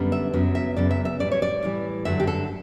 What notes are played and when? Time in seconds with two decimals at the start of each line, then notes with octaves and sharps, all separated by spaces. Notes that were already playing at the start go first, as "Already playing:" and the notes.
Already playing: F#2 D3 G3 B3
0.12 E5
0.33 F#2 C#3 F#3 B3
0.55 E5
0.77 F#2 C#3 F#3 B3 D5
0.91 E5
1.05 E5
1.19 A2 E3 G3 D5
1.31 C#5
1.42 D5
1.63 A2 E3 G3
2.05 G2 D3 F#3 A3 E5
2.20 G4
2.27 A4